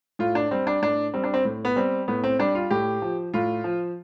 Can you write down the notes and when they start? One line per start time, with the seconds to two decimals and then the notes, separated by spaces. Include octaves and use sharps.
0.19 A2 F4
0.35 D4
0.51 G3 C4
0.67 D4
0.82 A2 D4
1.14 G3 C4
1.24 D4
1.34 C4
1.45 A2
1.65 B3
1.76 G3 C4
2.08 A2 B3
2.24 C4
2.39 G3 D4
2.55 F4
2.70 A2 G4
3.02 F3
3.34 A2 F4
3.64 F3